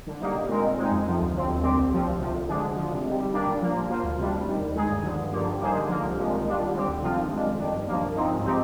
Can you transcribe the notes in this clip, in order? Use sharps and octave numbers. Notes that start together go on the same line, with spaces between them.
D3
G3 A#3 D#4
A#2
G#3 C4 D#4 A#4
A#2
G#3 C4 D#4
F2
C3 F3
D2
D3 F3 C4
D#2
D3 G3 C4 G4
C2
A#2 F3 C4
D2
C3 F3
D2
D3 G#3 D4 G#4
D2
D3 F3
C3
D#3 G3
G3
A#3 D4 G4 D5
A#2
F3 A#3
F3
A#3 F4 C5
D2
C3 G3 D4
C3
D#3 G3
D#2
D#3 G#3 D#4 G#4
G2
D3 F3
G2
D3 F3 A#3
G3
A#3 D#4 G#4 C5
D3
F3 A#3
C2
A#2 F3 G#3
D#3
G3 D4 F4
D3
G3 C4 G4
D2
C3 F3 C4 F4
D#3
G#3 D4
F2
D#3 G3 D4
G2
F3 A#3
C2
C3 F3 C4 D#4
G#2
F3 C4 D#4 G4